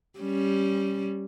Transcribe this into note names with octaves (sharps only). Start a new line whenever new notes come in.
G3 C#4